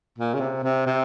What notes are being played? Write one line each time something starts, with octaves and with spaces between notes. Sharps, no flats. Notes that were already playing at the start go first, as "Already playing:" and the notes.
A#2
C#3
C3
C3
C3